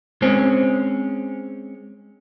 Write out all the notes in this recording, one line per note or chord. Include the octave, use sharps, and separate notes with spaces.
G#3 C4 C#4